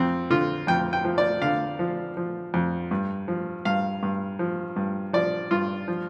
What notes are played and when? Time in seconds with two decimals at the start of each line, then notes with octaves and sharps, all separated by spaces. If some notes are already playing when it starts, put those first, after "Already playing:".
Already playing: F2 C4
0.30 D3 F4
0.67 F2 G5
0.93 G5
1.05 F3
1.18 D5
1.42 D3 F5
1.79 F3
2.17 F3
2.54 F2
2.91 G2
3.28 F3
3.65 G2 F5
4.03 G2
4.39 F3
4.76 G2
5.13 F3 D5
5.51 G2 F4
5.88 F3